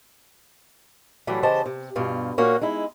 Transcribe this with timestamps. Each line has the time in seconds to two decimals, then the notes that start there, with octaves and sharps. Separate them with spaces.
1.27 A2 E3 F#3 G3 A3
1.43 C#3 E3 G4 C5 D#5 A5
1.66 C3
1.96 G2 B2 F4
2.38 A#2 A#3 C#4 F#4
2.61 G#3 D#4 E4